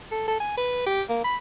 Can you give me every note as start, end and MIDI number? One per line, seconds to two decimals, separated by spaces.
0.11 0.27 69
0.28 0.36 69
0.40 0.54 80
0.57 0.83 71
0.86 1.02 67
1.09 1.20 58
1.24 1.36 83